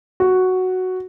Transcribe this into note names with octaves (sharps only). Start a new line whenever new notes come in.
F#4